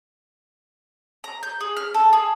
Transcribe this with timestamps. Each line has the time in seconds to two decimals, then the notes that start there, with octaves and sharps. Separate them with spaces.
1.24 A#5
1.43 G6
1.60 G#4
1.77 F6
1.94 A4
2.13 G#4